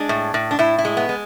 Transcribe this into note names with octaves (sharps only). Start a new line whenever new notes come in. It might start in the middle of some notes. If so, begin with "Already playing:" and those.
Already playing: G#3 D4
A2
A2
D4
A2 E4
E4
G#3
B3
G#3